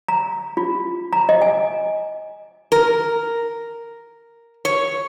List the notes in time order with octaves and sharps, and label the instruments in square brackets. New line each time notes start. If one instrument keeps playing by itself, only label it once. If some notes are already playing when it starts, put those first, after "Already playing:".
[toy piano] A#5
F4
A#5
D#5
G#5
[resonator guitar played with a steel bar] A#4
C#5